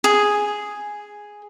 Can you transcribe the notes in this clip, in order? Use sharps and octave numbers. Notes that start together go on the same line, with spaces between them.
G#4